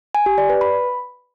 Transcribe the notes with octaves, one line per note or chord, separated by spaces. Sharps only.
G#5
G4
D5
B4
B5